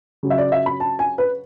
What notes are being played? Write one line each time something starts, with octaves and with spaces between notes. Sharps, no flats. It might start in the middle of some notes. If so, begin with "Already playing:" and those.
C#3 F#3
E5
D5
E5
B5
A5
G#5
B4